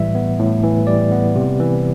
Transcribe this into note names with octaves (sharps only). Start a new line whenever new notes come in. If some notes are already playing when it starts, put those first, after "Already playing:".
Already playing: A2 E3 G3 E5
B3
A2
E3
G3 D5
B3
C3
E3